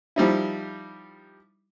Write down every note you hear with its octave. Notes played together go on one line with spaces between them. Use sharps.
F3 G3 D#4 E4